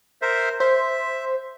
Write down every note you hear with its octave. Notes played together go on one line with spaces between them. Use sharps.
A#4 C5 E5
C5 E5